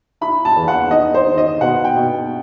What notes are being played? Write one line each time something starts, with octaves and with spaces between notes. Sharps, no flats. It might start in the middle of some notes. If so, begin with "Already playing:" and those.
E4 B5
A5
E2
F#5
D#4 D#5
C5
D#3
D#5
B2 F#5
G5
B2